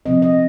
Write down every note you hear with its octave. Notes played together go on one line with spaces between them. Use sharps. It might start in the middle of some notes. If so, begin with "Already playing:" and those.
C3 F3 C4 D#5
D#5